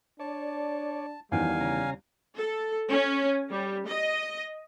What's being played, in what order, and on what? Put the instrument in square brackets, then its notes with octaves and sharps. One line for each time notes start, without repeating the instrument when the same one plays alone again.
[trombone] D4 [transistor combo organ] C#5 D5 [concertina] A5
[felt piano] E2 D#3 [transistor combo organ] F3 C#4 [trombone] G3 [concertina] F5 G#5
[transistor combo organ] C#3 C#4 A#5
[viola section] A4
C#4
G3
D#5